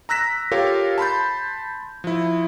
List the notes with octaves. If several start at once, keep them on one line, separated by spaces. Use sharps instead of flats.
A#5 E6 F#6 A#6 B6 E7
F4 G4 A4 A#4 C#5 F5
A5 B5 C6 G6
F3 E4